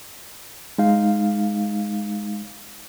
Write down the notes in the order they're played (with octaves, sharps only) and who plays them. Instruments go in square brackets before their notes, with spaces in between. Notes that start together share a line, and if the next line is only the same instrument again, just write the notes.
[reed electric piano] G#3 D#4 F5